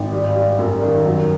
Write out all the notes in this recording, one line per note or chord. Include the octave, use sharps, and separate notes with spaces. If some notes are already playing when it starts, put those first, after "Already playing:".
Already playing: G#1
G3
G3
F#2
D#3
F#3